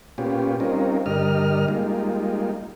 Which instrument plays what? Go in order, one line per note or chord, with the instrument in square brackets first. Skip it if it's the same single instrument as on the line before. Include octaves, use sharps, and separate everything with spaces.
[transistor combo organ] A#2 B3 C#4 F4 G4
G3 C4 C#4 D#4 F4 A#4
G2 D3 G3 A#4 D#5 F6
G3 G#3 A#3 D#4 F4